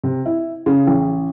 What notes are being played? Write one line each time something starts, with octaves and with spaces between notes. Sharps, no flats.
C3
E4
C#3
A1